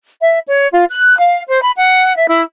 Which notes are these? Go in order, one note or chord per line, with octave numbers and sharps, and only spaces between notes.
E5
C#5
F4
F#6
F5
C5
B5
F#5
E5
E4